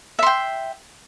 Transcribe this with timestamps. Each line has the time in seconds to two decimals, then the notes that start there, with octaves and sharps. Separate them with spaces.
0.19 E5
0.23 C6
0.27 G5